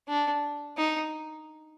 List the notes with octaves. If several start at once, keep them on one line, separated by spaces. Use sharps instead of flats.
D4
D#4